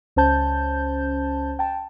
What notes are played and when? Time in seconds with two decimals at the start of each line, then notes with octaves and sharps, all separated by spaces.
0.16 C#2 C#4 C5 A5 G6
1.59 G5 A5